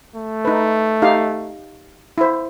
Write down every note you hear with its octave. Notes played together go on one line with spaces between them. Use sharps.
A3
D#4 B4
D#4 G4 F5
E4 C5